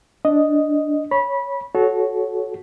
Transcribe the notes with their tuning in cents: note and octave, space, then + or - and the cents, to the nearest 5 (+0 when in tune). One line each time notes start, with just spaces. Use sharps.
D4 -5 D#5 +0
C#5 +0 B5 -20
F#4 +0 A4 -30 C#5 +0